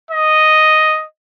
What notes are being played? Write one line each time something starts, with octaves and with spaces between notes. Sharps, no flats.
D#5